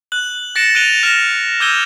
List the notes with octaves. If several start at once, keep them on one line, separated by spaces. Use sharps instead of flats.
F#6 F#7
F#6 A6 A#6 C#7 D7 E7
F#6 D7 D#7 F7 G7
F6 A#6 D7 E7
D6 E6 G6 G#6 D#7 G7